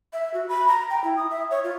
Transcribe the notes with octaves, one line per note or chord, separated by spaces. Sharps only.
E5
F#4
B5
A#5
G5
E4
D#6
E5
C#5
F4